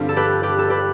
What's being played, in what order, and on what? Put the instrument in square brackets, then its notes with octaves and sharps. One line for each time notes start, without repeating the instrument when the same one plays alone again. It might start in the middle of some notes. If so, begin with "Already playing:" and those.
Already playing: [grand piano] G2 D3 G3 C4 F4
[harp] A4
G4 B4
G4 B4
A4
G4 B4